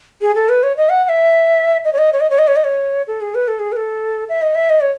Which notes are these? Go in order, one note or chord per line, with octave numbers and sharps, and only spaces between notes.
G#4
A4
B4
C#5
D#5
F#5
F#5
E5
D#5
C#5
D#5
C#5
D#5
C#5
D#5
C#5
D#5
C#5
A4
G#4
B4
A4
G#4
B4
A4
E5
D#5
E5
D#5
C#5